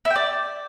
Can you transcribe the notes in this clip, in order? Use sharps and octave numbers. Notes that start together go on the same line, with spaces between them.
E4
G5
D5